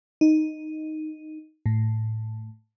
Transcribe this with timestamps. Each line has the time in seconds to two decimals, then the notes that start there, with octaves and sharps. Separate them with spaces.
0.21 D#4
1.66 A2